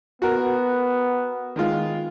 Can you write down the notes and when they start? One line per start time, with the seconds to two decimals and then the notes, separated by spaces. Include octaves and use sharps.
0.22 B3 F#4 A#4
1.56 D#3 G#3 F4